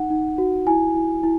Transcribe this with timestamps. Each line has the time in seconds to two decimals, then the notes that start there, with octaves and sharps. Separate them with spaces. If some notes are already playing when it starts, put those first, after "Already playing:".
Already playing: D#4 F#5
0.10 D#4
0.38 F#4
0.67 E4 G#5
0.95 E4
1.23 E4